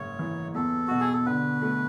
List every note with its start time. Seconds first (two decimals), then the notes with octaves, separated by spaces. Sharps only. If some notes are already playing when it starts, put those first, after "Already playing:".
Already playing: F#1 G#2 C#5
0.19 E3
0.54 E2 A4
0.88 B2 F#4
1.00 G#4
1.13 A4
1.26 D3 B4
1.62 A3